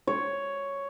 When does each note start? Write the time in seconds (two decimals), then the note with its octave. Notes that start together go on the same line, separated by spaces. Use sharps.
0.07 C#5